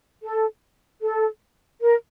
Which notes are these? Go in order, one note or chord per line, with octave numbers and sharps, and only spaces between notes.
A4
A4
A#4